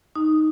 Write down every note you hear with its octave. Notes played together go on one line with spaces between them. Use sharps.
D#4